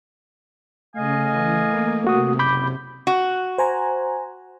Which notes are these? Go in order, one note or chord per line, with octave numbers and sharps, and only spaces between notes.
C#3 A3 D#5 F5 G#5
E3
A#3
C3 A#3 F#4 D#6
F#1 B5 D6 G6
F#4
C5 G#5 A#5